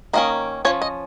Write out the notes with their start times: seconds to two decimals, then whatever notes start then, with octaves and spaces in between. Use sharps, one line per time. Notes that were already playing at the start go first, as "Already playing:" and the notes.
0.13 D#3 A#3 C#4 D#5
0.65 F3 C#4 C#5
0.82 D#5